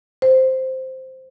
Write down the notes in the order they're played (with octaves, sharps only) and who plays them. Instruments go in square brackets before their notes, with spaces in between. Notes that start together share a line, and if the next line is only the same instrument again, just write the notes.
[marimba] C5